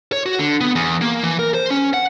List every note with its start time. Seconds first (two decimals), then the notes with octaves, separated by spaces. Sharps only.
0.13 C#5
0.26 F#4
0.39 D3
0.61 B3
0.76 E2
1.01 A#3
1.23 E3
1.39 A#4
1.54 C5
1.71 C#4
1.94 F#5